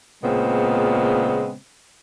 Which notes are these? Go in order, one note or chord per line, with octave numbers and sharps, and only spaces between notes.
A#2 C#3 G#3 B3 C4